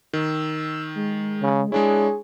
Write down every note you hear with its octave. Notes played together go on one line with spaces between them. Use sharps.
D#3 E6
G#3
C#3
G#3 D4 E4 G#4 C#5